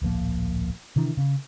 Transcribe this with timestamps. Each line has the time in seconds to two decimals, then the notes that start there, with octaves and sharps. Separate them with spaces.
0.02 D1 A#1 F3 A#3
0.96 C3 D#3 E3 D4
1.17 C#3 C#4